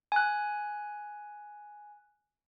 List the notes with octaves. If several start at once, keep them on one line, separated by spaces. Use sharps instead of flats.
G#5 F#6